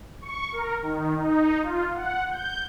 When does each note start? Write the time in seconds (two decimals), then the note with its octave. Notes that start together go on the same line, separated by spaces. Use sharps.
0.22 C#6
0.52 A#4
0.82 D#3
1.15 D#4
1.63 F4
1.95 F#5
2.31 G6